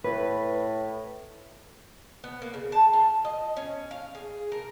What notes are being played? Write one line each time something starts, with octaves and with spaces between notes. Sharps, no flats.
A2 B4
B3
A#3
C#3
A5
F4
D#5
C#4
F5
G#4
A#4